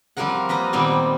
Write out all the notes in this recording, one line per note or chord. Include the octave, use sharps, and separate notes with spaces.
F3 G3 C4 F4 A#4 F#5
A#3 B4 D#5 A#5
A#2 D#3 G3 B3 C4 G5